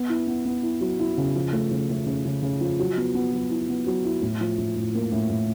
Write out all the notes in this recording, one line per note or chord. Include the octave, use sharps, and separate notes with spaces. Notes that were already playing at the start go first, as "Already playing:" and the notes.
Already playing: B3
E4
B3
B3
E4
F#3
E4
C#3
F3
A3
C#3
A3
C#3
C#3
C#3
F3
F#3
B3
B3
F#3
E4
B3
F#3
E4
A2
F3
A2
A2
A#3
A2
A2